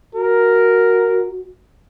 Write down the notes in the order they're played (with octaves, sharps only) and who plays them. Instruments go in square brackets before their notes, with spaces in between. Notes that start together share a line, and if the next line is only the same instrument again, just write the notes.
[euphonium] F#4 [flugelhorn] A#4